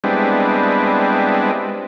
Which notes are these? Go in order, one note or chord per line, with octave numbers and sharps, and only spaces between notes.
G3 G#3 B3 C4 D4 E4